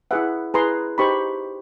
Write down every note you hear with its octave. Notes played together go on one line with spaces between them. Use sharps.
E4 G#4 B4 E5 F#5
E4 G#4 B4 A#5 C6
D#4 G4 C5 B5 C#6